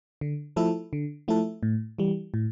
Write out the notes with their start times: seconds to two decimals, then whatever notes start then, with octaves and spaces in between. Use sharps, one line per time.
0.21 D3
0.56 F3 A3 E4 A4
0.93 D3
1.28 F3 A3 E4 A4
1.63 A2
1.98 E3 G3
2.34 A2